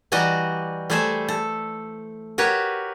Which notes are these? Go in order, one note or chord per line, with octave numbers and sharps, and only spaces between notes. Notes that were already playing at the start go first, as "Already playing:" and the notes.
E3 G3 F#4 D5 D#5 A#5
G3 A3 G#4 A4 C5 E5
A4
F#4 G4 A#4 B4 C#5